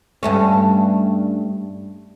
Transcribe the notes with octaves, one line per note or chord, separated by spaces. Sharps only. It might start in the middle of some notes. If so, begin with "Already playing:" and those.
G2 A3 C#4